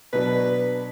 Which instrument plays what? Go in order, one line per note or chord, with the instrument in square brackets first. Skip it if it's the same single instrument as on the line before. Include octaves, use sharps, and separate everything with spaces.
[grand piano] B2 F#3 B3 D4 [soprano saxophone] B4